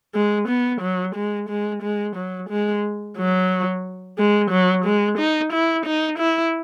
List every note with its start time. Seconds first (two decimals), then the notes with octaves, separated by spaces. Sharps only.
0.15 G#3
0.48 B3
0.81 F#3
1.15 G#3
1.49 G#3
1.83 G#3
2.16 F#3
2.50 G#3
3.17 F#3
4.18 G#3
4.51 F#3
4.85 G#3
5.18 D#4
5.53 E4
5.86 D#4
6.19 E4